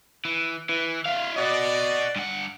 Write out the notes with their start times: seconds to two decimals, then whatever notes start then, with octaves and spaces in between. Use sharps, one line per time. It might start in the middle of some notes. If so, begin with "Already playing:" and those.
0.25 E3
0.69 E3
1.06 E4 F5
1.36 F#4 D5 D#5
2.16 G2 F#5